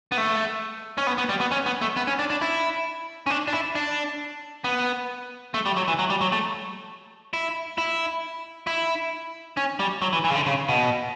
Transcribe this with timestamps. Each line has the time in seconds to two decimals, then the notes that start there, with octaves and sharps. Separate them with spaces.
0.12 B3
0.18 A3
0.98 C#4
1.07 B3
1.18 B3
1.29 G3
1.40 B3
1.51 C#4
1.66 B3
1.81 A3
1.96 B3
2.07 C#4
2.19 D4
2.30 D4
2.41 E4
3.26 C#4
3.30 D4
3.48 D4
3.53 E4
3.75 D4
4.64 B3
5.54 A3
5.66 G3
5.77 F#3
5.88 E3
5.99 F#3
6.10 G3
6.21 F#3
6.32 A3
7.33 E4
7.78 E4
8.67 E4
9.57 C#4
9.79 G3
10.02 F#3
10.13 E3
10.24 E3
10.30 C#3
10.35 D3
10.46 C#3
10.69 B2